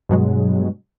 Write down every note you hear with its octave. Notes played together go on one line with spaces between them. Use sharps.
G2 B2 F#3 G#3